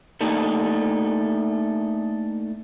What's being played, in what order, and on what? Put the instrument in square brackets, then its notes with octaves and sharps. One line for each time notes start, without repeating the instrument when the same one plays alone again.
[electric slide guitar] A3 A#3 D4 D#4